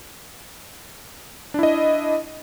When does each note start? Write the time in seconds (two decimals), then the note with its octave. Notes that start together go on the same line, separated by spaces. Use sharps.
1.54 D4
1.59 E4
1.63 D#5